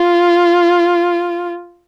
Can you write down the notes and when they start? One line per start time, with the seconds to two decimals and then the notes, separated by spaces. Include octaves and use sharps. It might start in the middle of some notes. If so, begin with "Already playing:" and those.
Already playing: F4